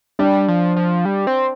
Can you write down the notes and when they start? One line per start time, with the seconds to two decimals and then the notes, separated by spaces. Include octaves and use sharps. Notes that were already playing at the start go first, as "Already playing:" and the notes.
0.19 G3 D4
0.48 F3
0.76 F3
1.05 G3
1.27 C4